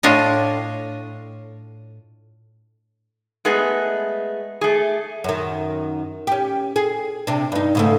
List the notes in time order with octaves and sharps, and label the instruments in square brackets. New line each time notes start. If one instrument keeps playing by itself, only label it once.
[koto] A2 D4 F4 C#5 D#5
[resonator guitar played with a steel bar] G#3 A3 B3 G#4 D#5
A3 G#4
[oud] F#2 D#3
C#4 G4
G#4
C3 D4
G2 D#4
G#2 C#3 A3